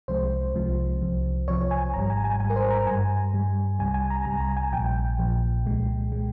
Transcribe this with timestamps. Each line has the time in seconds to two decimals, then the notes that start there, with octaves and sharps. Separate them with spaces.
0.08 C2 C3 F3 G#3 C5
0.55 C2 C3 F3 G#3
1.01 C2 C3 F3
1.48 C2 C3 F3 C#5
1.71 G#5
1.94 G#1 G#2 G3 A#5
2.10 G#5
2.24 G#5
2.40 G#1 G#2 G3 G#5
2.50 A#4
2.56 C5
2.71 A#5
2.87 G2 G3 G#5
3.34 G2 G3
3.79 C2 C3 G3 G#5
3.94 G#5
4.10 A#5
4.25 C2 C3 G3 A#5
4.41 G#5
4.57 G#5
4.72 A#1 A#2 F3 G5
5.18 A#1 A#2 F3
5.65 C2 A#2 G#3
6.12 A#2 G#3